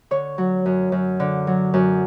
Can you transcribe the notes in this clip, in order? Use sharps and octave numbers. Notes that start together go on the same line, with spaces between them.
D3 C#5
F#3
F#2
F#2
D3
F#3
F#2